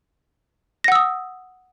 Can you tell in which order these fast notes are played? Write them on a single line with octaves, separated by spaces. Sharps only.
A#6 F#5 E6 D#6